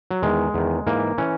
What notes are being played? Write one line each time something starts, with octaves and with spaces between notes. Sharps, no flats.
F#3
E2 D#3 G#3
E2 D#3
G#2 E3 A#3
E3 C#4